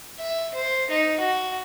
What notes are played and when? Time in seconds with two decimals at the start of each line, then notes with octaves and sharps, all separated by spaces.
0.19 E5
0.54 C5
0.90 D#4
1.20 F#4